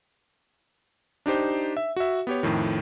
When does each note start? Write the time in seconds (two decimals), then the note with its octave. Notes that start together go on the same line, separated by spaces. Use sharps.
1.26 D4 D#4 G4 C5
1.77 E5
1.96 F#4 E5
2.27 B3 G4 C#5
2.43 F2 A2 D#3